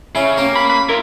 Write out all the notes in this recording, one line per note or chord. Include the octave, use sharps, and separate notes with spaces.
C#3 C#4 E4
A#3 C#4 G4
B5
B5
E4 F4 A#4